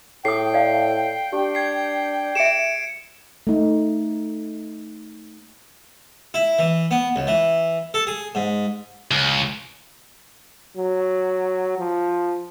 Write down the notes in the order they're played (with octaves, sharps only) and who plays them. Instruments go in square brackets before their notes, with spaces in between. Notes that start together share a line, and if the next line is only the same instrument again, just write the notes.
[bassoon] A2 [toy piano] G#4 D#6 [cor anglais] G5 [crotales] C7
[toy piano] D5 F5 A5
[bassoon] D4 [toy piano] G4
[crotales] G#6 C7
[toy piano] G#4 E5 [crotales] C#7 D7 E7
[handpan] A3 D#4
[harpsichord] E4
E3
B3
C#2
E3
A4
G#4
G#2
[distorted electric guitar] C#2
[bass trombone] F#3
F3